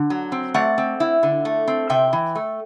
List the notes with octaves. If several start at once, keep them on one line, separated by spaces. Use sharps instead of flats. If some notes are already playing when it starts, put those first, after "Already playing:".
Already playing: D3
F#3
C4
A3 D5 F#5
C4
E4
D3
A3
C4
C3 E5 G5
E3
A3